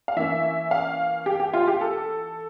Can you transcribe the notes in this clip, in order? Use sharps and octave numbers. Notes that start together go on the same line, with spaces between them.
F5
E3 A#3 C#4 E5
F5
G4
G4
F4
G4
A4